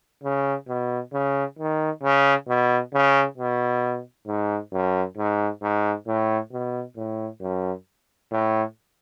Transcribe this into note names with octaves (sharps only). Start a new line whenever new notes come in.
C#3
B2
C#3
D#3
C#3
B2
C#3
B2
G#2
F#2
G#2
G#2
A2
B2
A2
F#2
A2